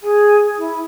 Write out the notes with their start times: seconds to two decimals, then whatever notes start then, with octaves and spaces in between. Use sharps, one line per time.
0.01 G#4
0.57 E4